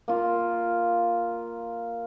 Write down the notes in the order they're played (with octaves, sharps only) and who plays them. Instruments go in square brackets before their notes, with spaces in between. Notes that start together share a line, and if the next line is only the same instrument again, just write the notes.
[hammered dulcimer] A#3 F4